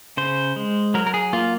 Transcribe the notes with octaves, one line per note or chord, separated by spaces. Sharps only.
C#3 C5
G#3
F#3 A#4
A#4
G#4
A#3 F4